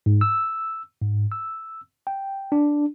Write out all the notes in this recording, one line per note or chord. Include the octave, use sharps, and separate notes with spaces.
G#2
E6
G#2
E6
G5
D4